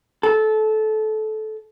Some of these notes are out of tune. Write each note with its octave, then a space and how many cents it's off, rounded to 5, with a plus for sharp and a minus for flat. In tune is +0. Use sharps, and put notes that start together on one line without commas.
A4 -20